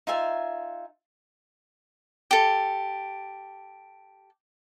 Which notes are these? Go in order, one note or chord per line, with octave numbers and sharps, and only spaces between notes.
D#4 F4 E5 G#5
G4 A4